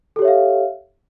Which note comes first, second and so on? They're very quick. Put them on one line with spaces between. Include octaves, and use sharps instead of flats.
A4 G4 C#5 E5 F5